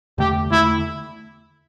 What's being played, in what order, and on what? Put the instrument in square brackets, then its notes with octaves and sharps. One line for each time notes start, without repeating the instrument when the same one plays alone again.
[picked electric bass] E2 D3 A3 [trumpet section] G4
[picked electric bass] E2 D3 A3 [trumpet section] E4